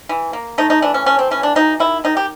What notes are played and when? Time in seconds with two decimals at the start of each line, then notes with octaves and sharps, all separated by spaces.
0.09 E3
0.33 A#3
0.58 A3 D#4
0.70 D#4
0.82 E3 D4
0.94 C#4
1.06 A3 C#4
1.19 C4
1.31 E3 C#4
1.43 D4
1.55 F#3 D#4
1.80 D#3 E4
2.04 D#3 D#4
2.17 G4